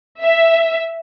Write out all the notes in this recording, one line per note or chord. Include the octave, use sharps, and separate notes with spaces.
E5